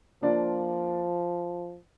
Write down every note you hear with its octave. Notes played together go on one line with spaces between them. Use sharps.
F3 A#3 D4 F4 D5